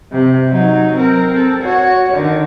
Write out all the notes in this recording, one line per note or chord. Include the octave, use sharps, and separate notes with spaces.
C3
F#3 D#4
C4 A#4
C4 A4
F#4 C#5
D3 D#3